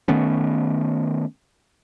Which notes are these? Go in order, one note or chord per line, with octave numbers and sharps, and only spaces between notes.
D#3 A3 B3 C#4